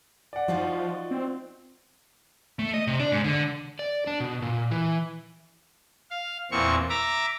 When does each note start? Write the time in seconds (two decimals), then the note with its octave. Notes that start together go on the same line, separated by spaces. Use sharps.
0.33 D5 F#5
0.48 F3 D#4 F4 F#4
1.11 C4
2.59 A3
2.74 D#5
2.87 C3
2.99 D4
3.12 G#2
3.24 D3
3.79 D5
4.07 D4
4.20 B2
4.42 A#2
4.71 E3
6.11 F5
6.51 E2 A#2 C4 C#6
6.90 E5 A#5 D6